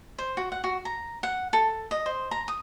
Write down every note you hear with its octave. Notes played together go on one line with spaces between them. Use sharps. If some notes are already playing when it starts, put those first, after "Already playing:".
C5
F#4
F#5
F#4
A#5
F#5
A4
D#5
C5
A#5
D#6